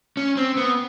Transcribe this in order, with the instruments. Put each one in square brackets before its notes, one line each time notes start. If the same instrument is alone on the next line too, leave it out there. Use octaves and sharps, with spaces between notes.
[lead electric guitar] C#4
C4
B3